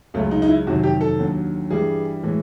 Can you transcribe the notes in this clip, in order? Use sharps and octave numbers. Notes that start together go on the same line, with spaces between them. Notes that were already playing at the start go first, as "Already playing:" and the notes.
C#2 C#3 F#3 A3
D#4
D#4
E4
F2 C3 D#3 F#3 F#4
G4
A4
D#2 D3 F#3
G2 E3 G3 G#4
A2 E3 G#3